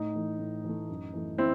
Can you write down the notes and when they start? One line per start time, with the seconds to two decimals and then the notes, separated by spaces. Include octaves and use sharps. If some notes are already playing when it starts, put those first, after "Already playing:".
Already playing: A2 D#4
0.15 E3 A3
0.39 A2
0.65 E3 A3
0.89 F#2
1.14 E3 A3
1.38 C4 E4